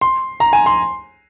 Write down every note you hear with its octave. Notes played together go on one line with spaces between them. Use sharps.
C6
A#5
G#5
C6